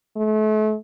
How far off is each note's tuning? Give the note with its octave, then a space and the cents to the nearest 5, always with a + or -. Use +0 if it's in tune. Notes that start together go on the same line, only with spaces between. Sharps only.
A3 -35